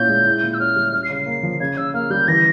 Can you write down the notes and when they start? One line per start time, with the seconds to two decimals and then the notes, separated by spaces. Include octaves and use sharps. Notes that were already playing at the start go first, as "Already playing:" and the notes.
Already playing: A#2 C#4 E4 G6
0.08 G#3
0.26 E4
0.43 A#2
0.54 E6
0.59 C#4 F6
0.76 G3
0.93 C#4 F6
1.04 C7
1.10 C#3
1.16 C7
1.26 A#3
1.43 F3
1.60 C#3 G#6
1.77 C#3 E6
1.94 A#3 F6
2.10 G3 G6
2.28 E3 A#6